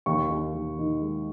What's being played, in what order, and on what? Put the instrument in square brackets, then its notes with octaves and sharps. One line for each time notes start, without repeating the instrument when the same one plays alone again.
[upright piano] D#2 C#6
D#2
D#2
D#3
G#3